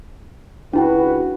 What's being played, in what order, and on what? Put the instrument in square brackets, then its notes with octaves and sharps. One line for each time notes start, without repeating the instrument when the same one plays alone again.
[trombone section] C#2 F#4 B4 [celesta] D4 E4 G5